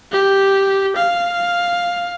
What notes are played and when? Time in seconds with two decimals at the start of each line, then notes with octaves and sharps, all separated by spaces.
0.12 G4
0.96 F5